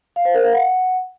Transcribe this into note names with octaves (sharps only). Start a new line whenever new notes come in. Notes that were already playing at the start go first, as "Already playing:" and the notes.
F5
C5
A#4
F5
F#5